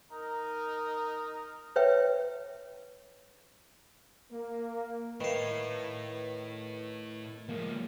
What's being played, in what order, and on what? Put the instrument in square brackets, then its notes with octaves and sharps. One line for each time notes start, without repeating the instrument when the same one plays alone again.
[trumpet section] D#4 A#4
[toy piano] B4 C#5 E5 G5
[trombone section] A#3
[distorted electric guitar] A2 [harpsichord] D#3 F5 [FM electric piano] B4
[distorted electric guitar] F3 G#3 [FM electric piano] A#3